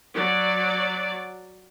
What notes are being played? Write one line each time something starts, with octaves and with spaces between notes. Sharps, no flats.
F#3 D5